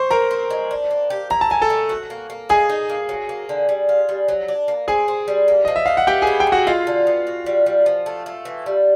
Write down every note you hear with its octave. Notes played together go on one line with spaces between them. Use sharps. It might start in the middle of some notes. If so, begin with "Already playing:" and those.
Already playing: C5 C6 C#6
C4 A#4 A#5
C4
G#3
D4
A#3
G4
E4 A#5
A5
A3 G#5
A4 A5
A3
F#4
A#3
A#3
D#4 G#4 G#5
D#4
A#3
F#3
A#3
D3
G3
F4
G3
F#3
D4
A#3
C4 G#4 G#5
C4
G3
A#3
F3 D#5
E5
D#4 F5
F#5
B3 G4 G5
G#4 G#5
E4
G5
E4
F#4 F#5
G#3 F4 F5
D3
B3
F#4
G3
G3
F3
A3
A3
E3
G3